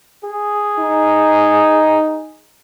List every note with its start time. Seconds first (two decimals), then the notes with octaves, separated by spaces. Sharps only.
0.24 G#4
0.79 D#4